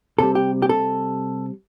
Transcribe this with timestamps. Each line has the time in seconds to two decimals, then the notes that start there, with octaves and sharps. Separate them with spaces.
0.19 C3 G3 A4
0.35 G4
0.62 G4
0.69 A4